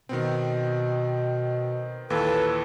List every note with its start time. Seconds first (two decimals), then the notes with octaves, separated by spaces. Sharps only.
0.09 B2 D#3 B3 C4
2.10 D#2 A#2 E3 A4 B4